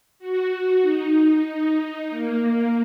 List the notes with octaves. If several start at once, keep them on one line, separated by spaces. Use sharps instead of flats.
F#4
D#4
D#4
A#3